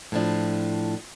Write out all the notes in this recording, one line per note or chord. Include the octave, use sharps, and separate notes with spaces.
A2 F3 D4